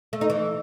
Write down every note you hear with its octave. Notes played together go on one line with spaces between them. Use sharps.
A3
D#4
E3